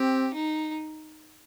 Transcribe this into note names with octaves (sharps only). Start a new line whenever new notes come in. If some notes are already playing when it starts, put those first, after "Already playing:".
Already playing: C4 G4
D#4